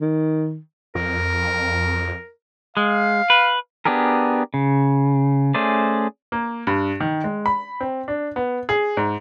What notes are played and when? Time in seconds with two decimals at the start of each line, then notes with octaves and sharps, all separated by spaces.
0.01 D#3
0.95 F2 A#4
2.77 G#3 F5
3.30 B4
3.85 B3 D4 G4 G#4 A#4
4.54 C#3
5.54 A3 C#4 G#4 C5 D5
6.32 A#3
6.67 G2
7.00 D#3
7.24 G#3
7.46 B5
7.80 C4
8.08 D4
8.36 B3
8.69 G#4
8.97 G#2